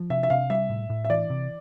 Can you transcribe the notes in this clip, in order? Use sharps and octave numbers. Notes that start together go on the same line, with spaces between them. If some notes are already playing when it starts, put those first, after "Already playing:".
Already playing: F3
C3 E5
E5
C3 F5
G3 E5
A2
A2
E5
E3 D5
C3